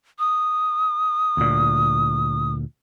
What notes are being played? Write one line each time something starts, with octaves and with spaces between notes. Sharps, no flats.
D#6
D2 A#2